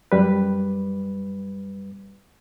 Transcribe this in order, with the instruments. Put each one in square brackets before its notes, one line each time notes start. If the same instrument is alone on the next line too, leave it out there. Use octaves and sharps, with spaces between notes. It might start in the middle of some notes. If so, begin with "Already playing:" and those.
[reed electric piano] F#2 G3 B4